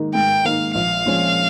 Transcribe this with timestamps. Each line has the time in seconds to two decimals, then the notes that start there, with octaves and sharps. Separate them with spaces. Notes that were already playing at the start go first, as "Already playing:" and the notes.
Already playing: G#2 D#3 A#3 D#4
0.15 G#2 G5
0.45 D#3 A#3 D#4 F5
0.74 A#1 F5
1.05 A#2 F3 G#3 C#4